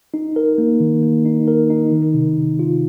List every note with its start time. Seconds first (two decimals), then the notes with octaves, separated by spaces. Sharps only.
0.14 D#4
0.36 A#4
0.58 A#3
0.80 D#3
1.02 A#3
1.25 D#4
1.48 A#4
1.70 D#4
1.92 D#3
2.14 C3
2.37 C3
2.59 F4